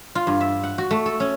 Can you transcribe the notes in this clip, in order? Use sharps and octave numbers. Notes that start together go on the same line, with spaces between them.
F4
G2
E5
F#5
F#4
A3
A4
C#4